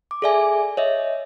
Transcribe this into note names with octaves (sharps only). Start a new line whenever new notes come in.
D6
G#4 A4 D5 E5 G#5
C#5 D#5 E5